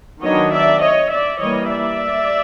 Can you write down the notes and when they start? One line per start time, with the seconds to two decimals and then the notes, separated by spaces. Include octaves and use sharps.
0.21 D#3 F#3 B3 D4 C#5 D#5
0.52 D5 E5
0.80 C#5 D#5
1.11 D5 E5
1.39 E3 G3 A#3 C#5 D#5
1.69 D5 E5